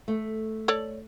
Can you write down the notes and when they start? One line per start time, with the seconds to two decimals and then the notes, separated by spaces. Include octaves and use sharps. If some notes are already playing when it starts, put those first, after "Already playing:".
0.08 A3
0.68 A4 C#5 D5